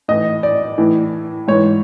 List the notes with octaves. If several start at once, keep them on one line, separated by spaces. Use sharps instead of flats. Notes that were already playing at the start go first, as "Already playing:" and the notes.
A2 E3 D#5
D5
A2 E3
G#2 E3 C#5